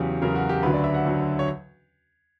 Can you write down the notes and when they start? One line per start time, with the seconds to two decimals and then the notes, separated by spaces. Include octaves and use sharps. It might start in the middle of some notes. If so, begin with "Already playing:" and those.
Already playing: E2 C#3 F#3 G4
0.22 E2 C#3 F#3 A#4
0.36 F#4
0.49 G4
0.63 D2 D3 F#3 B4
0.74 D5
0.84 E5
0.94 F#5
1.05 D2 D3 F#3
1.39 C#5